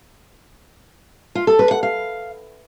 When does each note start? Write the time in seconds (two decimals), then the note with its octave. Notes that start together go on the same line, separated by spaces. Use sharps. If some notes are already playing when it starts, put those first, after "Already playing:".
1.35 F4
1.47 A4
1.59 B4
1.71 F#5
1.83 F5